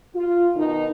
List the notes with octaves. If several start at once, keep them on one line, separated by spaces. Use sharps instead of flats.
F4
B2 D#3 D#4